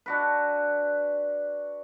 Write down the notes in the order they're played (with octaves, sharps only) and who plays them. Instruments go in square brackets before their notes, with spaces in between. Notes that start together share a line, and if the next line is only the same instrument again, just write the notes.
[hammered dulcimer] D4 F#4 B4